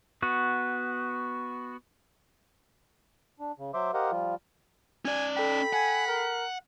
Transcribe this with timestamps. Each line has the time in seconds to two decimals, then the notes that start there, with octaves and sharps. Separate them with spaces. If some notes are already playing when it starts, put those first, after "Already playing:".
0.22 B3 F#4
3.40 D4
3.58 C#3
3.74 F#3 C5 E5 C6 D6
3.94 G4 A#4 C5 D#5 F5 F#5
4.11 F3 G3 F4
5.05 C#4 D5 G#5
5.37 A4 G5 B5
5.73 F#5 G#5
6.07 A#4